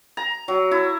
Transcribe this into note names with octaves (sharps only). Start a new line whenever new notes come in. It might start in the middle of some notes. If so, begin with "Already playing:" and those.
A#5
F#3
E4